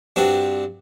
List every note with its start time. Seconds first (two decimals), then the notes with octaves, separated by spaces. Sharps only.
0.16 G2 C4 D4 F#4